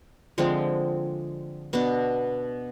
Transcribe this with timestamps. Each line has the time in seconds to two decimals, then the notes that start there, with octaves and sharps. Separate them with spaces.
0.38 D3 F3 G#3 C4
1.73 B2 B3 D4